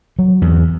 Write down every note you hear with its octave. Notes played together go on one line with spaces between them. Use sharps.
F#3
E2